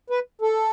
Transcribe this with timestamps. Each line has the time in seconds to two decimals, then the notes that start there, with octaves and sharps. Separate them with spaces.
0.10 B4
0.42 A4